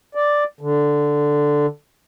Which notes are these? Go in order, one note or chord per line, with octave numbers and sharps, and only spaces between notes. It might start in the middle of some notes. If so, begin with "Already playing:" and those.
D5
D3